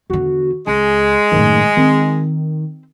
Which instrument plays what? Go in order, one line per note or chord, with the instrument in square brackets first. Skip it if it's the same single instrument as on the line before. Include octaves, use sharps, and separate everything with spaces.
[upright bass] E2 D3 [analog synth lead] F#4
[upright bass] C#2 [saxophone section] G#3 [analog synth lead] G#5
[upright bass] F#1 A2 [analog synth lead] D#3
[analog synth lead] D#3 [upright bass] C4